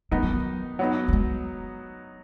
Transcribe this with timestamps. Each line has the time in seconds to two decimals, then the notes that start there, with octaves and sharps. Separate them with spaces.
0.11 D#3 G#3 B3 D#4
0.22 F#3
0.34 F#3
0.79 F#3 B3 D#4
1.08 F#3
1.13 G#3